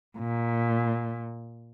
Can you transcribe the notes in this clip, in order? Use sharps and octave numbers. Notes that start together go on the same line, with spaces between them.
A#2